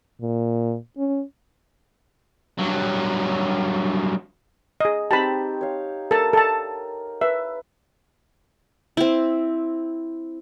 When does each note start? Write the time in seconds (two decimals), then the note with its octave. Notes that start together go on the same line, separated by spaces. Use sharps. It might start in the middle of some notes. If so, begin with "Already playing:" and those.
0.21 A#2
0.98 C#4
2.59 G2 F#3
4.80 G#4 D#5
5.11 C4 D#4 G4 A5 B5
5.61 C#5 F5
6.11 A4 A#4 A5
6.33 A4 A5
7.21 B4 E5
8.97 C4 E4